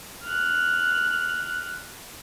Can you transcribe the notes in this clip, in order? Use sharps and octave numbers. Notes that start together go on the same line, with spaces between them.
F6 F#6